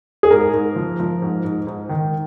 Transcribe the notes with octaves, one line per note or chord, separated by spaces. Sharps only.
G#4
G#2 A#4
G#2
F3
F3
G#2
G#2
G#2
D#3